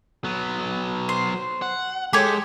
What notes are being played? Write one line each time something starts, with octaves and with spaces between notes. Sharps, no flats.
F#3 B3
C5
F#5
G#3 G4 A4 C#5